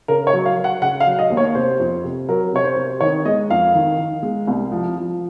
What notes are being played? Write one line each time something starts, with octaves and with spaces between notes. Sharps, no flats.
C#3 A#4
C#5
F#3
F5
F#3
F#5
C#3 F#5
F5
F#3
D#5
D#2
C#5
C3 C5
F2
C3
F#3 A#4
C3 C#5
C5
C3
D#3 C#5
G#3 D#5
F2 F5
D#3
D#3
G#3
C2
F3
F3